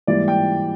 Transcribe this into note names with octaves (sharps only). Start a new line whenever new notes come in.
G#2 E3 G3 A#3 D5
G5